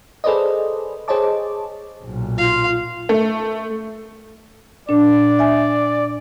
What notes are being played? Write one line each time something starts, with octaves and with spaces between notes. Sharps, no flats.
G#4 A4 B4 C5 D5 D#5
G#4 C5 C#5 D#5 A5 D6
B1 A#2
F4 F5
A3
A#2 D4 D5
E5 G#5